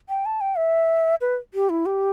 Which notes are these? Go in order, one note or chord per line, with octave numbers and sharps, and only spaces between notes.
G5
A5
G5
E5
B4
G4
E4
G4